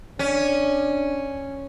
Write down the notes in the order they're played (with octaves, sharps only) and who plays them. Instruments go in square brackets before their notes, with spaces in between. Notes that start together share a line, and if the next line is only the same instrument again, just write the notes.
[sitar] C#4 [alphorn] D4